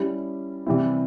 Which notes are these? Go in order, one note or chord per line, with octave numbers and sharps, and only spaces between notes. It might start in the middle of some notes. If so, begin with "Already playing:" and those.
Already playing: G3 C#4 E4
C3 E3 G3 C4 E4